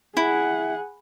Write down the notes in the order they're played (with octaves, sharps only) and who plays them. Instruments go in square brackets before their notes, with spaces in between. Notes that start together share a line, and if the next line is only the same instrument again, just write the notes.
[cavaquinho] E4 [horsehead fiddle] G#4 F#5